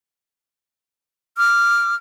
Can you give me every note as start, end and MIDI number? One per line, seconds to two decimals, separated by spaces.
1.36 1.95 86
1.36 1.95 89